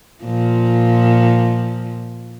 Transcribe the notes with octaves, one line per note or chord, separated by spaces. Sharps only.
A#2 F3